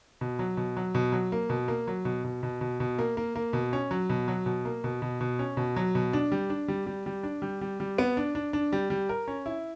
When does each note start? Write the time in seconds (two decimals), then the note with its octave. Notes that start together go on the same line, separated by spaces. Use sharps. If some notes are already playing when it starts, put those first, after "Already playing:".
0.21 B2
0.39 F#3
0.57 B2
0.77 F#3
0.95 B2
1.12 F#3
1.32 A#3
1.50 B2
1.68 A#3
1.88 F#3
2.05 B2
2.24 B2
2.43 B2
2.61 B2
2.80 B2
2.98 A#3
3.17 A#3
3.36 A#3
3.53 B2
3.73 C#4
3.91 F#3
4.10 B2
4.28 F#3
4.46 B2
4.65 A#3
4.84 B2
5.02 B2
5.21 B2
5.39 C#4
5.57 B2
5.76 F#3
5.95 B2
6.13 D4
6.32 G3
6.50 D4
6.68 G3
6.86 G3
7.06 G3
7.23 D4
7.42 G3
7.61 G3
7.80 G3
7.98 B3
8.17 D4
8.35 D4
8.53 D4
8.72 G3
8.90 G3
9.09 A#4
9.28 C#4
9.46 E4